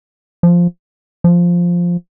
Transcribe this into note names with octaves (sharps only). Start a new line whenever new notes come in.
F3
F3